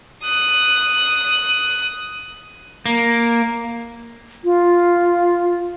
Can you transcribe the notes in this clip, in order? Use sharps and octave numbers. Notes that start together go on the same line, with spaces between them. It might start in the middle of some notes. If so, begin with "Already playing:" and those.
D#6 F#6
A#3
F4